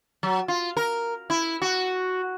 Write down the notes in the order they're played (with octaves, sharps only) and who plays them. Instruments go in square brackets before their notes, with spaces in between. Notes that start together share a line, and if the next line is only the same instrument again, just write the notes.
[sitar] F#3
F4
A#4
E4
F#4